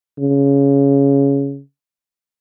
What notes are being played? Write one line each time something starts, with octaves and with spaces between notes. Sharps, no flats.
C#3